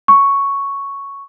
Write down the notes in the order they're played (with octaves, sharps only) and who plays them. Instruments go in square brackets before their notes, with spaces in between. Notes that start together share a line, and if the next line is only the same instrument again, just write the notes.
[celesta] C#6